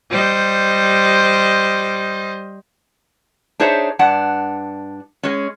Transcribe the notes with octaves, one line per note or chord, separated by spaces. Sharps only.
G3 C5 D#5
D4 D#4 G#4 C5 C#5 E5
G2 D4 F#5
G#3 C#4